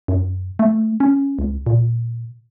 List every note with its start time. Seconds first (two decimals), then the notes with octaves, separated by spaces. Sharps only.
0.08 F#2
0.59 A3
1.00 C#4
1.39 C#2
1.66 A#2